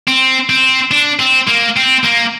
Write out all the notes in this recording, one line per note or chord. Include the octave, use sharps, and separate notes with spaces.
C4
C4
D4
C4
A#3
C4
A#3